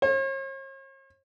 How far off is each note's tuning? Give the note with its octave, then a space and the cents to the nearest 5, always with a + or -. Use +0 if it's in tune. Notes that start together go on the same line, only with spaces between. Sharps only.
C#5 -45